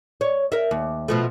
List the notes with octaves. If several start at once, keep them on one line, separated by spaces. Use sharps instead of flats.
C#5
A#4 E5
D#2
B2 F3 A3